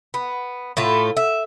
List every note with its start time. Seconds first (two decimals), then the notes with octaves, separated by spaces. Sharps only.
0.14 B3
0.77 A2 A3 F4
1.17 E5